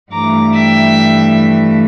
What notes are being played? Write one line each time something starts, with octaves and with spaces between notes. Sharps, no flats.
G2 E3 A3 A#5 D6
E5 G5